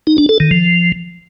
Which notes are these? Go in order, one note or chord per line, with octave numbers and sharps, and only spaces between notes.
D#4
D4
A4
D#3
F3